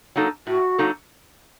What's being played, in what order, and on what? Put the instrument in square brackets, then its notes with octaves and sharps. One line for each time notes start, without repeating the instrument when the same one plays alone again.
[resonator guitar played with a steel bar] F#3 A#3 D#4 A4
[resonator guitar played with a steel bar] A2 [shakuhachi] F#4
[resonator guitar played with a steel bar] F#3 A#3 D#4 A4